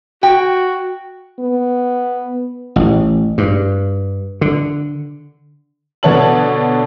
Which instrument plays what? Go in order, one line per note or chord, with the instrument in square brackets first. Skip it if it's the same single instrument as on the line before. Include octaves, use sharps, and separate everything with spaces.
[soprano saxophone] F#4 [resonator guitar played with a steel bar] G5
[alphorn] B3
[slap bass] A1
G2
D3
[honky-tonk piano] B2 D3 B3 C#5 A5 F#7